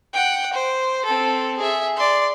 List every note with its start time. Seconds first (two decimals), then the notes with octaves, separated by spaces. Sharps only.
0.14 F#5 G5
0.53 C5
1.05 C4 A4
1.58 G#4 E5
1.97 D5 C6